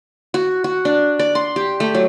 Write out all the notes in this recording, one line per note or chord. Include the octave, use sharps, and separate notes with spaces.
F#4
F#4
D4
D5
C6
G4
A3
F#3